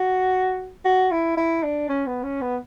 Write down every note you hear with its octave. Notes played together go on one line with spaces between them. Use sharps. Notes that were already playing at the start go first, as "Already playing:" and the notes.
Already playing: F#4
F#4
E4
E4
D4
C#4
B3
C#4
B3